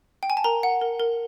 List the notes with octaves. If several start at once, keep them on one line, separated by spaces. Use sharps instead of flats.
G5
G#5
A5
A#4 A#5
F#5
A#4
A#4